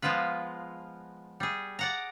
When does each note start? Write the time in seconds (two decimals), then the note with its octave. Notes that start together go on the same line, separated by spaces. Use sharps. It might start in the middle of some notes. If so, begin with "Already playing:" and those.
0.02 F3 G#3 B3 F4 B4
1.40 G3 G#4
1.79 D5 F#5 A#5